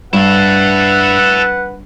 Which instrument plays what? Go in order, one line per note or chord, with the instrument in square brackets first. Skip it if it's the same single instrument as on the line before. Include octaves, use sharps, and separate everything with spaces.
[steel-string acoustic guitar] G2 [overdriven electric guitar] E4 A4 [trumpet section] B4 F#5